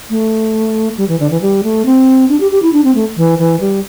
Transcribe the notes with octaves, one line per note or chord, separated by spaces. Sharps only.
A3
G3
E3
D3
E3
G3
A3
C4
D4
G4
G4
E4
D4
C4
A3
E3
E3
G3